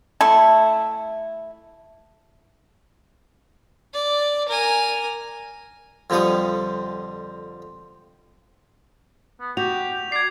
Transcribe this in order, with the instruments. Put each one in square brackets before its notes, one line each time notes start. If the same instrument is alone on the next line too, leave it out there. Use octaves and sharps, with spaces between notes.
[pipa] A3 E4
[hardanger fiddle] D5
A#4 G#5
[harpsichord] F2 D3 F3 G3 C#6 D#6
[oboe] B3
[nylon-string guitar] F#4 [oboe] G4 [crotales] F7
[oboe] D5 [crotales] G#6 C7